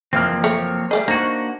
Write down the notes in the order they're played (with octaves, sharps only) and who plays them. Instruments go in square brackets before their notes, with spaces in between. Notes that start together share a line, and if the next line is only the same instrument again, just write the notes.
[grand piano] F#1 F6 [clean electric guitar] E3 [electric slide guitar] F3 A#3 C4
[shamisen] A3 [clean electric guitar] C#5
[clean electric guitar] G3 G#4 [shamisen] A3 D5 D#5
[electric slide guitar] A#3 F#4 [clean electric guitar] D4 F#5 [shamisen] D#4 [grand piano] C5 C#6